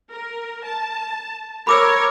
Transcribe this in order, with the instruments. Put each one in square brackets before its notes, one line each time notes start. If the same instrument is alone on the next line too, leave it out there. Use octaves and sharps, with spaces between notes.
[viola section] A#4
A5
[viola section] A#4 C#5 [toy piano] B5 D6 E6